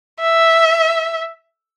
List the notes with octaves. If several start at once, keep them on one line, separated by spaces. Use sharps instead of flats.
E5